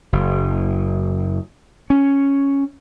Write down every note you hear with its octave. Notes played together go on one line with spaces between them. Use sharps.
F#1
C#4